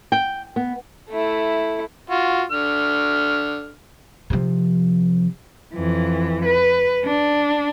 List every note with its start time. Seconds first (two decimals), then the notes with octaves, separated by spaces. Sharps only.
0.12 G5
0.56 B3
1.09 A3 E4
2.10 F4 F#4
2.52 D3 F6
4.30 C3 F3
5.74 F2 E3
6.45 B4
7.04 D4